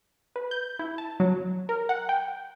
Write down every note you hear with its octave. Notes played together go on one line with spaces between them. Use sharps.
B4
G6
E4
A5
F#3
A#4
F#5
G5